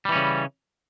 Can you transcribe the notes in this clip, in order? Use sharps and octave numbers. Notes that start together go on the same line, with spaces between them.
C#3 E3 G3 C#4